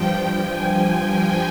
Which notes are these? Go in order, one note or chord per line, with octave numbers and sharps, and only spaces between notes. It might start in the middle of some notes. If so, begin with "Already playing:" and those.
Already playing: G2 F3 G5
G#5